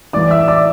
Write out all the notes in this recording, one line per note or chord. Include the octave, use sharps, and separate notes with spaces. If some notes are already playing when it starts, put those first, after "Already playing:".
A1 A2 E3 D5 D6
E5 E6
D5 D6